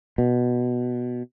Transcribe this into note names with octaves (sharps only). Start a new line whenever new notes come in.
B2